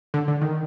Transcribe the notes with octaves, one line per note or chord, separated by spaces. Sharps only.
D3
D3
D#3